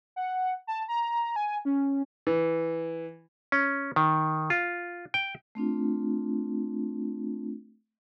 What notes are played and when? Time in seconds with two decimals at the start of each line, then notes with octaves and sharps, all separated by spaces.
0.16 F#5
0.67 A5
0.88 A#5
1.36 G#5
1.65 C#4
2.27 E3
3.52 C#4
3.96 D#3
4.50 F4
5.14 G5
5.55 A3 C4 D4 F4